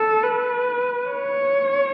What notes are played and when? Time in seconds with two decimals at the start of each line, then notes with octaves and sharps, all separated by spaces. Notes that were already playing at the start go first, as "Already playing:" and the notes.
Already playing: A4
0.24 B4
1.10 C#5